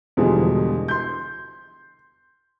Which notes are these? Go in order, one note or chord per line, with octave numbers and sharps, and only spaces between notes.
E2 B2 D3 F3 G3 G#3
C6 G6